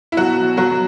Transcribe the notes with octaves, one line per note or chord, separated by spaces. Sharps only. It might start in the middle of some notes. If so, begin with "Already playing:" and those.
E4
B2 F#3 F#4
B2
F#3 F#4
B2